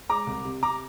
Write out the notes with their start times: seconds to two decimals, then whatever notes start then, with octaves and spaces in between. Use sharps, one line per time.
0.10 G#3 A#5 D6
0.27 C2
0.45 C3
0.63 C3 A#5 D6